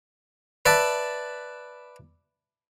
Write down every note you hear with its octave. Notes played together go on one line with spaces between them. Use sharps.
B4 D5 E5 A5